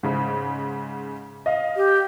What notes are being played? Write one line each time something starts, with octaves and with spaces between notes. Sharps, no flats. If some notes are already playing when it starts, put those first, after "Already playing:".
G#2 C#3
D#5 F5
G4